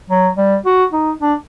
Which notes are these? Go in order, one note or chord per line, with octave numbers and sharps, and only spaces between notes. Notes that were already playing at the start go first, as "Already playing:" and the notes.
F#3
G3
F#4
D#4
D4